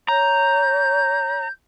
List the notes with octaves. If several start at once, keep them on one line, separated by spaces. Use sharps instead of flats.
C#5 A#5 G6